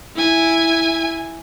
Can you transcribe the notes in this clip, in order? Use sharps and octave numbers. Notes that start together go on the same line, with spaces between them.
E4 G#5